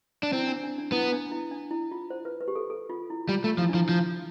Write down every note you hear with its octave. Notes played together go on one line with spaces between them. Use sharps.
D4
C4 E4
D4
D4
D4
B3 E4
D4
E4
D4
E4
F4
C5
B4
B4
G4
A4
A4
F4
E4
G3 F4
A3 F4
F3 E4
D4
F3 E4
F3 E4